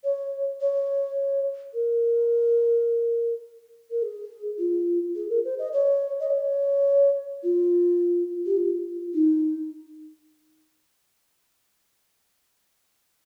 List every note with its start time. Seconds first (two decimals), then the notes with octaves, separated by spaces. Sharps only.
0.04 C#5
0.61 C#5
1.74 A#4
3.91 A#4
4.03 G#4
4.59 F4
5.16 G#4
5.30 A#4
5.44 C5
5.59 D#5
5.73 C#5
6.20 D#5
6.30 C#5
7.43 F4
8.46 G4
8.57 F4
9.14 D#4